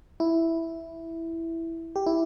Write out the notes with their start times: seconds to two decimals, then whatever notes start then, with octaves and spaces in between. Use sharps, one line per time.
0.20 E4
1.96 G4
2.06 E4